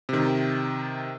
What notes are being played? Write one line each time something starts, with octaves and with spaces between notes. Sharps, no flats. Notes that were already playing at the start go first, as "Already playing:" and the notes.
C3 D#3